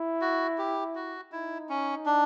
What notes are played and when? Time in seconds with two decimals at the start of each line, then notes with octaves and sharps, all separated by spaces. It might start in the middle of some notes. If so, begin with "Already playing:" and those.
Already playing: E4
0.21 F#4
0.58 G4
0.95 F#4
1.32 D#4 E4
1.69 C#4
2.06 D4